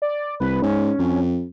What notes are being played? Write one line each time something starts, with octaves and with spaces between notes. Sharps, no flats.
D5
C2 B4
G#2 C#4
F2